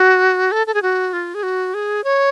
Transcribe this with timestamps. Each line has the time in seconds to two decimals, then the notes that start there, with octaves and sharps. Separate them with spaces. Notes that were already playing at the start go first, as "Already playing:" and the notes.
Already playing: F#4
0.52 A4
0.67 A4
0.74 G#4
0.82 F#4
1.13 F4
1.35 G#4
1.43 F#4
1.74 G#4
2.04 C#5